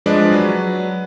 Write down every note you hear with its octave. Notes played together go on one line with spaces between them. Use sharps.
F3 G#3 D4 B4 D5 D#5
F#3 B4